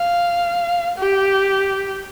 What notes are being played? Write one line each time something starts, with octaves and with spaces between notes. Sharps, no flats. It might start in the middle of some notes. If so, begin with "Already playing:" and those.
Already playing: F5
G4